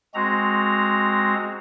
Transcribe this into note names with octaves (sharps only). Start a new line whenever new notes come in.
G#3 C4 F#4 A#5